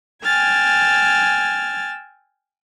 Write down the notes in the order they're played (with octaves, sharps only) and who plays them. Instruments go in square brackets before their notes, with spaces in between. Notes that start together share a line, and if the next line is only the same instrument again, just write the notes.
[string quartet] G5 G#5 E6 F6 G#6 A6